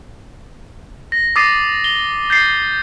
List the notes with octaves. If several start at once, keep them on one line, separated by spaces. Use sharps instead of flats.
A#6
D6 D#6 A6 A#6 C7 D#7
G7
G6 A6 C7